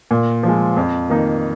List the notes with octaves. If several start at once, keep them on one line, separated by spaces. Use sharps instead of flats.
A#2
F3 G#3
F2
D#3 A#3 D#4